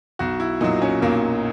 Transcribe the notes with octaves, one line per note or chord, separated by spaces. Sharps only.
B1 F#4
E4
A#2 F#3 D#4
C#4
B1 A#3